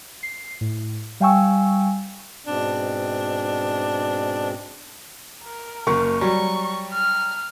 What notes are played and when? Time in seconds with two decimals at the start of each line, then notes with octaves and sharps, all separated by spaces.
0.23 C7
0.61 A2
1.20 G3 F5 G5 G#5 C#6 E6
2.47 G#2 B2 C4 D4
5.44 A#4
5.87 F#1 A#3 C#6
6.21 F#3 G3 C#6
6.93 F6